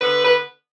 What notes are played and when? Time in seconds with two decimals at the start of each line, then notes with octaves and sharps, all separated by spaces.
0.01 D3 B3 B4
0.25 B4